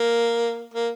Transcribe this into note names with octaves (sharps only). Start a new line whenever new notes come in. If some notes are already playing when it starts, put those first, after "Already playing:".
Already playing: A#3
A#3